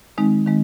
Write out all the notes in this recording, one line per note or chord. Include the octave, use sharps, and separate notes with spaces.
D#3 G#3 C4 D#4
D#3 G#3 C4 D#4